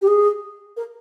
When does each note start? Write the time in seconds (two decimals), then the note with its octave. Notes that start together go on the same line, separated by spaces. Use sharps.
0.02 G4
0.07 G#4
0.77 A#4